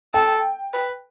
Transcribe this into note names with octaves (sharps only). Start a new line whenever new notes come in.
A4 G5
B4